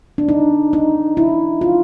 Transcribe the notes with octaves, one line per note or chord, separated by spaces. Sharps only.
D4
D#4
D#4
E4
F4